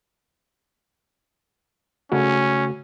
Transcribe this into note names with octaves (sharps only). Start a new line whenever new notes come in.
C#3 A3 C#4 F#4